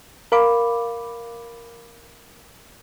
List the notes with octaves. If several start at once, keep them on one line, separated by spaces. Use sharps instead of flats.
A#4 F5 B5 D6